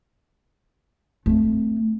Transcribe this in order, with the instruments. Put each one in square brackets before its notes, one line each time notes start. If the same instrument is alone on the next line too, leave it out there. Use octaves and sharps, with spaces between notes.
[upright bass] A3 C4